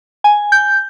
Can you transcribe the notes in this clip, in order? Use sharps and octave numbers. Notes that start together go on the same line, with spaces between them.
G#5
G6